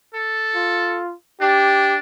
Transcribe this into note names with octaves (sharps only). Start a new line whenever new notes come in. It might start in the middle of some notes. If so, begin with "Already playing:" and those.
A4
F4
D4 G4